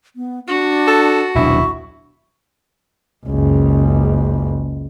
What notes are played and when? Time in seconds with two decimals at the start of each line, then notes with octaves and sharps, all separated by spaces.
0.16 B3
0.48 D4 F#4
0.87 A4
1.36 D#1 B1 D4 E4 C#6
3.26 F#1 C#2